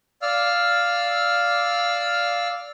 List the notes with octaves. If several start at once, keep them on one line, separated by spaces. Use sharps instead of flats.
D5 F5 E6 F6